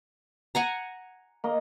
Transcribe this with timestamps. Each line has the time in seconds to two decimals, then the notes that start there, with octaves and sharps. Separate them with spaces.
0.55 F#5 G#5 A#5
1.44 A#3 D#5